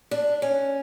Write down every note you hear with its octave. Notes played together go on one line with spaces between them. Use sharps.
D4
C#4